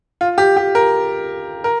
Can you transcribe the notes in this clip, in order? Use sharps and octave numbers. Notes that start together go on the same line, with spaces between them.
F4
G4
G4
A#4
A#4